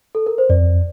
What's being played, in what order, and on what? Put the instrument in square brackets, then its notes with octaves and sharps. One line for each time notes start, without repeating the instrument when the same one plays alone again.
[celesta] A4
A#4
C5
[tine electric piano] F2 [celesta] D5